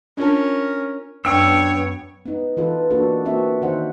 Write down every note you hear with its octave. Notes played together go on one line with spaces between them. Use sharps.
C#4 D4 F4 A#4 A5
F#2 B3 D4 C#5 G5 E6
B3 D#4
E3 D#4 F4 A4 B4
A#3 B3 D4 F#4 A4
A#3 C4 F#4 E5
D#3 D#4 C5 F#5